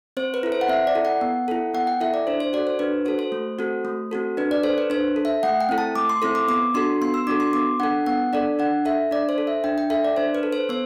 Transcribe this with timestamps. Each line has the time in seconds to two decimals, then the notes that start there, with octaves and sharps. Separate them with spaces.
0.17 C4 C5
0.34 B4
0.43 E4 A4
0.52 C5
0.61 F#5
0.68 C4 E5
0.87 D5
0.95 E4 A4
1.05 F#5
1.21 B3
1.48 E4 A4
1.74 B3 F#5
1.87 G5
2.01 E4 A4 E5
2.14 D5
2.27 D4 C5
2.40 C5
2.53 F#4 A4 D5
2.67 C5
2.79 D4 B4
3.05 F#4 A4 C5
3.19 C5
3.32 A3
3.59 C4 F#4 A4
3.85 A3
4.11 C4 F#4 A4
4.37 D4 B4
4.51 D5
4.63 A4 C5
4.78 B4
4.90 D4 C5
5.16 A4
5.25 E5
5.43 A3 F#5
5.61 G5
5.69 C4 E4 A4
5.78 A5
5.95 A3 D6
6.09 C6
6.22 C4 E4 A4 C6
6.35 D6
6.48 B3 D6
6.74 D4 F#4 A4 C6
7.01 B3 C6
7.14 E6
7.27 D4 F#4 A4 D6
7.40 C6
7.53 B3 D6
7.80 D4 A4 F#5
8.06 B3 F#5
8.33 D4 A4 D5
8.59 D4 F#5
8.85 A4 E5
9.11 D4 D5
9.29 C5
9.38 A4
9.47 E5
9.64 D4 G5
9.78 G5
9.90 A4 E5
10.05 D5
10.17 D4 C5
10.35 B4
10.43 A4
10.53 C5
10.69 B3 C5